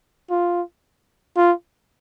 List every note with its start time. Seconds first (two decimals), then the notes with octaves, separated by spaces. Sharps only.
0.30 F4
1.37 F4